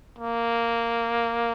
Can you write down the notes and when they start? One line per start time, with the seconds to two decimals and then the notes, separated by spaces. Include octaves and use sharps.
0.19 A#3